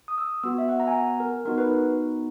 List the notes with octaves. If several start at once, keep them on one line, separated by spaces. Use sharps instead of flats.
D#6
E6
B3 F#4 E6
E5
F#5
A#5
G#5
F#5
A#4
B3 D#4 F#4 A#4
B4